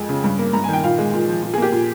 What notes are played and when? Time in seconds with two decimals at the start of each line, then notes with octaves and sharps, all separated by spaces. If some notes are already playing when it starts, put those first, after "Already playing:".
Already playing: F2 G#3
0.09 C#3
0.24 G2
0.39 A#3
0.53 G2 A#5
0.64 G#5
0.68 D#3 G5
0.84 A#2 F5
0.98 G#3
1.13 A#2
1.28 F3
1.42 A#2
1.54 G#4
1.58 A#3 G4
1.72 A#2